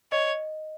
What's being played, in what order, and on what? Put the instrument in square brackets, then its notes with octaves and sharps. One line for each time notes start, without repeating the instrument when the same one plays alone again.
[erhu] C#5 [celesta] D#5